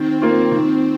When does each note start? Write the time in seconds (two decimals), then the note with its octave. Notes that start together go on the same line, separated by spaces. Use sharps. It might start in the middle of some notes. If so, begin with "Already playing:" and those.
Already playing: D#3 C4
0.22 A#3 C4 F4
0.51 D#3